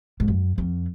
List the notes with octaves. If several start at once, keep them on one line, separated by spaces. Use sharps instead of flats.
G#2
F#2
F2